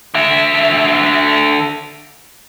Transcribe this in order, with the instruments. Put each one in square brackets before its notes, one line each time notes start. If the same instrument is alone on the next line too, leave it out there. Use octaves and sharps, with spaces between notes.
[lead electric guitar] D3 E5